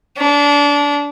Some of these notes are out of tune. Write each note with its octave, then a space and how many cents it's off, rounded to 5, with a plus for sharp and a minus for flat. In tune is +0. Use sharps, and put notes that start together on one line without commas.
D4 -25